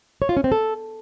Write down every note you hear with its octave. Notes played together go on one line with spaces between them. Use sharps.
C#5
F4
C#4
C4
A4